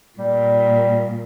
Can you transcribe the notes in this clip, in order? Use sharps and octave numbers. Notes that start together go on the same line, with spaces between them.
A#2 G3